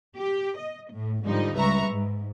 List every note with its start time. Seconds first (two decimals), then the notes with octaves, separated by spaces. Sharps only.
0.17 G4
0.57 D#5
0.92 A2
1.24 G#2 D3 F3 G3 D#4
1.56 C#2 G3 B4 E5 A#5 C#6
1.88 G#2